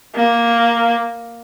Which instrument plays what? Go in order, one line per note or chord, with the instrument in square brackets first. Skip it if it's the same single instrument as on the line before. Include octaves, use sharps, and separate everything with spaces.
[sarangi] A#3